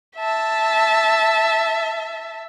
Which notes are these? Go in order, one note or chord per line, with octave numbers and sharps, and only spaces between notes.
E5 A5